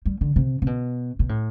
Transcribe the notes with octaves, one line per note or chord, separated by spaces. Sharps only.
G3
D3
C3
C3
B2
B2
A2